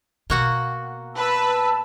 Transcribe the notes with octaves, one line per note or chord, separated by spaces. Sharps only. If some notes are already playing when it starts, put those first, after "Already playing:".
B2 A#3 F#4 F#5
B4 A5 E6